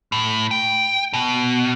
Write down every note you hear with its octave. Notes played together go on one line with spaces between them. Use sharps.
A2
G5
B2